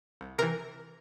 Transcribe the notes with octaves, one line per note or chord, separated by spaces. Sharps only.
C2
C3 E3 A#4